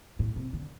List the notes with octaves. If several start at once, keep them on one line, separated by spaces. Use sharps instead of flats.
A2
C3
D3